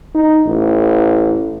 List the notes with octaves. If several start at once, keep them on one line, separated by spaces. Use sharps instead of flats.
D#4
A1